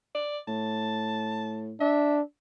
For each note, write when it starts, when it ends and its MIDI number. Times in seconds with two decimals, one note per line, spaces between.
0.15 0.39 74
0.48 1.75 45
0.48 1.63 81
1.80 2.22 62
1.80 2.17 76